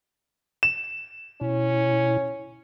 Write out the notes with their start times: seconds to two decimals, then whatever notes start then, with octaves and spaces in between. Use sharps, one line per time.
0.63 E7
1.41 B2 C#4 E4